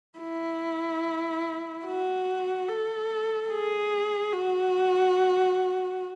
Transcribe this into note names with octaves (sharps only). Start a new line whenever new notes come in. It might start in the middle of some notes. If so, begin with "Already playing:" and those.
E4
F#4
A4
G#4
F#4